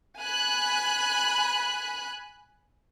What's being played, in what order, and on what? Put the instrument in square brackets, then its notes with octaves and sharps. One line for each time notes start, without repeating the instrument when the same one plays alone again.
[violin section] G#5 B5 F#6